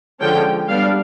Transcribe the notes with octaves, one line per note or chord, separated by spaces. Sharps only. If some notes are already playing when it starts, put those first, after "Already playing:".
D3 F3 G#3 C#4 G5
G3 B3 D4 F5